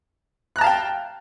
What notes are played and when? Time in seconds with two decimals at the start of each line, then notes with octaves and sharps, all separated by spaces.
0.56 F#6
0.58 A#5
0.61 A5
0.64 F5
0.67 G5